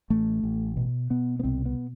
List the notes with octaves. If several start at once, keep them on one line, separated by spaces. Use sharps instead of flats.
A1 A3
A1
B2
B2 B3
B3
C2 C4
B3